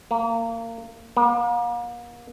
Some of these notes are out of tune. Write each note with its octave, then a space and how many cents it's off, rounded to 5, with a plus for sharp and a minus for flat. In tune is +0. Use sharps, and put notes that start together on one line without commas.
A#3 -25
A#3 +40